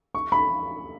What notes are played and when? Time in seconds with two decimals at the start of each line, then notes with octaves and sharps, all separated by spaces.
0.15 C#6
0.32 B5